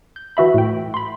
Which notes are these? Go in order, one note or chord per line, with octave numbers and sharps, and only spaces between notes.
G6
E3 F#4 E5 B5
A2 G5
B5 C6